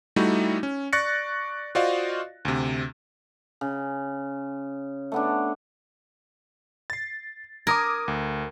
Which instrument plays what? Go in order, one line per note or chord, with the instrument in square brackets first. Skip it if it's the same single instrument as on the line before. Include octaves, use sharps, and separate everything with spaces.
[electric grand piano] G3 A3 D#4 E4 F#4
C#4
D5 C#6 F#6 A6 A#6 C#7
F4 F#4 C5 D5 D#5 F5
D2 C3
[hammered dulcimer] C#3
A3 B3 D4
[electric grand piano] A6 C7
[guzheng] A#4 [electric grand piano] D6 D#6 G#6
[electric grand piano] D2